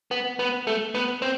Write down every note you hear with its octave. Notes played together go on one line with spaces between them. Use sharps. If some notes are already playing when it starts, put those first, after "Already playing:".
B3
B3
A3
B3
C4